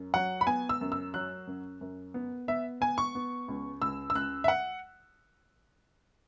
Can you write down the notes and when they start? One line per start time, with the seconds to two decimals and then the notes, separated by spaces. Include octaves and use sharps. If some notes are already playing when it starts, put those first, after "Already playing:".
Already playing: F#2
0.14 F#3 F#5
0.41 B5
0.47 B3 G#5
0.69 E6
0.81 F#2
0.92 E6
1.14 F#3 F#6
1.47 F#2
1.81 F#2
2.14 B3
2.48 B3 E5
2.81 B3 G#5
2.98 C#6
3.15 B3
3.48 C#2
3.82 C#2 E6
4.10 E6
4.15 C#2 F#6
4.44 E5
4.48 F#5